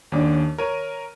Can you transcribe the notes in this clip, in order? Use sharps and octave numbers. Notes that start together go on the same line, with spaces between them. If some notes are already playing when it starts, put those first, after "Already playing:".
D#2 C#4 D4 D6
A#4 C#5 D#7